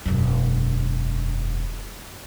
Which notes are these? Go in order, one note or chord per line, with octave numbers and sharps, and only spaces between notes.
E1 F#2